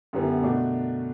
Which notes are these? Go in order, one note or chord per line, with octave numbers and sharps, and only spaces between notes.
F#2 D3 G3 B3 E4
B2 A3 D4 F#4